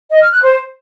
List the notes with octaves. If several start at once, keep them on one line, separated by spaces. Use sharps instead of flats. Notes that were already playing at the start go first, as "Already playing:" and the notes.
D#5
F6
F#6
C5